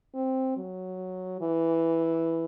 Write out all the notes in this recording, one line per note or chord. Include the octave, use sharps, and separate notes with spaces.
C4
F#3
E3